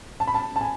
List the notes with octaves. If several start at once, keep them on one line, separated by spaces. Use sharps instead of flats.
A5
B5
A5
A5
G#5